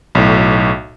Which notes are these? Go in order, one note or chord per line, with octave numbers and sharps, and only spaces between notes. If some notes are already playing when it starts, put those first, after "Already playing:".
B1 A2